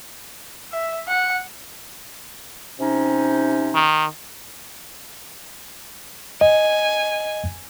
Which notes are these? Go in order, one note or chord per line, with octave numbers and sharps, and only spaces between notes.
E5
F#5
C3 C#4 D#4
D#3
D#5 G#5